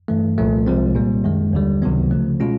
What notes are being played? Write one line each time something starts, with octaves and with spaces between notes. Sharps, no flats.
G2 E3 A3
C2 A#2 F3 A3
C2 C3 F3 G#3 C4
A#2 G3 A#3
F#2 D#3 G#3
D#2 D3 G3
C#2 C3 D#3 F#3 B3
C#3 F3 A3
B2 G#3 C#4 F4